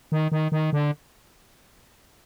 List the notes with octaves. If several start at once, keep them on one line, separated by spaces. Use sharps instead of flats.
D#3
D#3
D#3
D3